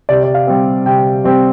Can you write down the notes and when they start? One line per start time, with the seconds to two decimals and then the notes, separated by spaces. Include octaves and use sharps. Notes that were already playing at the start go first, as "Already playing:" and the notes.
0.09 C3 D5
0.24 D5
0.34 F5
0.47 G3 C4
0.85 C3 G5
1.24 G3 C4